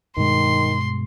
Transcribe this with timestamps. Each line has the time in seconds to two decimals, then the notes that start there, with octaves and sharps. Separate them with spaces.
0.17 G2 B2 D#3 G#3 C6